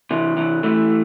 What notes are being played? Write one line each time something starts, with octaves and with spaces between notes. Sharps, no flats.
C3 E3
C3 E3
E3 A3